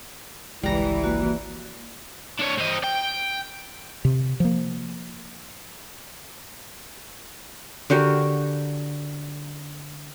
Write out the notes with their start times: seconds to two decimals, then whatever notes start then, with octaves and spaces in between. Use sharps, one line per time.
0.63 G#1 C#2 E3 G3 G#3 A#5
1.04 A#3 F#4
2.39 D4 C#5
2.58 C4 D#5
2.84 G5
4.05 C3
4.40 F3 A#3
7.90 D3 F#4 G4 A#4